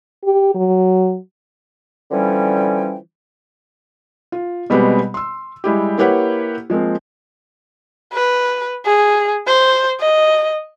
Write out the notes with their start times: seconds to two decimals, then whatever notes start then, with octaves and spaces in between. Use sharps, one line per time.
0.24 G4
0.54 F#3
2.11 D3 E3 F3 G3 C#4 G5
4.32 F4
4.70 B2 G3 G#3 B3 C4 G4
5.14 C6 E6
5.64 G3 G#3 E4 G4
5.98 A#3 E4 G4 B4 C#5 F#5
6.70 F3 G#3 A#3 C4
8.13 B4
8.86 G#4
9.47 C5
10.00 D#5